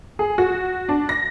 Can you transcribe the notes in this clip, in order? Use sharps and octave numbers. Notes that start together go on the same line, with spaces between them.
G#4
F#4
D4
A#6